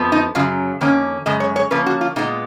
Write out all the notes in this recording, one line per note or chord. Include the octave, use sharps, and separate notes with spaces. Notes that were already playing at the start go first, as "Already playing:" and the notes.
Already playing: F2 F3 B3
D#4
F#2 C#3 F#3 F4
F2 D#3 A#3 C#4
F#2 C#3 G#3 D#5
C#5
C#5
C#3 F3 A#3 C#4 B4
F#4
F4
A#2 G#3 B3 D#4